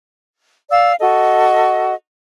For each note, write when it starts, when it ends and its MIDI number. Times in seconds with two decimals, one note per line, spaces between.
0.71 0.92 74
0.71 0.92 77
0.71 0.92 88
0.99 1.94 66
0.99 1.94 69
0.99 1.94 75